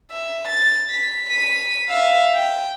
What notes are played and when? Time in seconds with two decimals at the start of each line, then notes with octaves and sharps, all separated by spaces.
0.11 E5
0.48 A6
0.91 B6
1.29 B6 D#7
1.88 E5 F5
2.35 G5